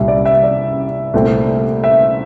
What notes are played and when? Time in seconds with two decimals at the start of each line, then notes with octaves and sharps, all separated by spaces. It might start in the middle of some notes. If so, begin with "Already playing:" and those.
Already playing: C2 A#2 G3 E5
0.08 D5
0.25 E5
0.43 D5
1.14 C2 A#2 A3 C4
1.84 E5